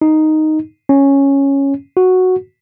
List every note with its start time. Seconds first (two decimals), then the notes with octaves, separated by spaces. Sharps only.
0.02 D#4
0.89 C#4
1.97 F#4